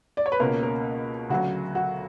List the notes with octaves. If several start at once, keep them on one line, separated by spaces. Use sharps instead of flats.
D5
C#5
B4
C#2 B2 A#3 C#4 A#4
A#4
D2 C#3 F#3 F#4
F#4